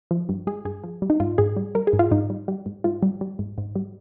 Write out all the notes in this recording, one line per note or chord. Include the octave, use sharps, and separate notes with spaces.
F3
G2
G#3 G#4
G2 G#4
F3
G3
D#4
G#2 F4
G#2 G#4
G3
G3 A#4
G#4
G#2
F4
G#2 D#4
G3
G3
G#2
G#2 F4
G3
G3
G#2
G#2
G3